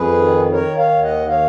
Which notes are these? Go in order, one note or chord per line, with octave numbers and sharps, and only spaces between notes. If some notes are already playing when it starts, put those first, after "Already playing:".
Already playing: F2 G#4 B4
D#3
D#3 A#4 C#5
C#5 F5
D#2
D#5 F#5
D#3 C#5 F5